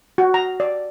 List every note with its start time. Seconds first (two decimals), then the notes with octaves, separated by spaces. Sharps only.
0.18 F#4
0.34 A#5
0.60 D5